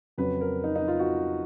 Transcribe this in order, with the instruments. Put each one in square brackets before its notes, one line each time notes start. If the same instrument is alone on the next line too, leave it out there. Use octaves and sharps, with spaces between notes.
[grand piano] F2 C#3 F#3 B4
A#4
D#4
D#4
F4
F#4